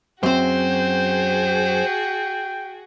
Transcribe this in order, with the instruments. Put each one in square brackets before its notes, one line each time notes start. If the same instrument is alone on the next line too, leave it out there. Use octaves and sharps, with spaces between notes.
[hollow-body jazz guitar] F#2 C4 [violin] F#4 G#4 [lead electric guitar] C5 [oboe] G5